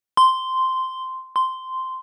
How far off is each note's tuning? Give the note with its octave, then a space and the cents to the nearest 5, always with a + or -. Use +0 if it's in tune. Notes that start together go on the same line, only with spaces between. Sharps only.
C6 -10
C6 -10